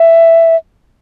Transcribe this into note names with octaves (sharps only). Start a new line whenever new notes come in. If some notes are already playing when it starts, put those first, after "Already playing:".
Already playing: E5